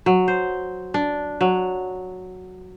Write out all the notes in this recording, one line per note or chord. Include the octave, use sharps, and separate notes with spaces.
F#3
C5
D4
F#3